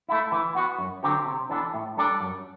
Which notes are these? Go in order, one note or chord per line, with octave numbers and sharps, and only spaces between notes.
A3 E4
E3
B3 F#4
F#2
D3 F#3 C4 G4
C3
E3 B3 D4 A4
A2
G3 D4 A4 D5
F#2